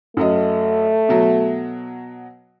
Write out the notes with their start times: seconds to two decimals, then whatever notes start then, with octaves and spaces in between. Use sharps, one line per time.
0.17 F#2 F#3 A3 D#5
1.09 B2 F#3